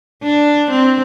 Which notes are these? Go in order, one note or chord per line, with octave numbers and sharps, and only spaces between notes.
D4
C4